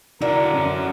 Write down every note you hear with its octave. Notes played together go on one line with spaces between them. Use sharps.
D3 E4 F#4 A#4
C#4 F#4